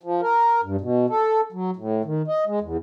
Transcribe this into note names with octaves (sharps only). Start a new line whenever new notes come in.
F3
A#4
G2
B2
A4
F#3
A2
D#3
D#5
G#3
E2